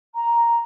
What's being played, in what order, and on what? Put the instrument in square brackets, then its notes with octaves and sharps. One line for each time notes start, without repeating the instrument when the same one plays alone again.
[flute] A#5